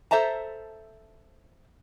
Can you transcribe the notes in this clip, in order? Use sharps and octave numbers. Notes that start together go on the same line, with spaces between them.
A4 C5 E5 A5 A#5